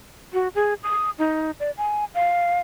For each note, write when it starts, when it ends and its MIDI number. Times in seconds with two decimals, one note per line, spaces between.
0.33 0.48 66
0.55 0.74 68
0.83 1.10 87
1.19 1.51 63
1.60 1.71 74
1.77 2.05 80
2.15 2.60 77